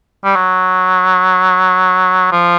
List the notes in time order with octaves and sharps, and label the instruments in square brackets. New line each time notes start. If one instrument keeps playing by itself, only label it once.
[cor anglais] G3
F#3
F3